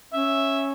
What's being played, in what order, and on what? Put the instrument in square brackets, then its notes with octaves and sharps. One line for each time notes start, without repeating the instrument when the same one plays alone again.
[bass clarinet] C#4 [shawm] E5